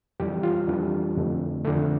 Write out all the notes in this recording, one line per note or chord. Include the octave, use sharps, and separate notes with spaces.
F2 E3 G3 G4
F4
F2 E3 G3 D4
F2 D3 A3
F2 D3 A3